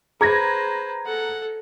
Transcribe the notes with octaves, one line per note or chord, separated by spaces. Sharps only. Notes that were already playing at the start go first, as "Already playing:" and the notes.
G#4 B4 C5 A#5 G#6 A#6
A4 F#5